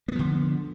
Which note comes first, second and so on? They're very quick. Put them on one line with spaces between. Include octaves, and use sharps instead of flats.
A#3 B3 F3 D3